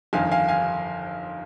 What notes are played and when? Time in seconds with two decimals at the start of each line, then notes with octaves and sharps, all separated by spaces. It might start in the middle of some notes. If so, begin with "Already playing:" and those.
0.13 G1 F2 D#3 F5 G#5
0.31 F5 G#5
0.48 F5 G#5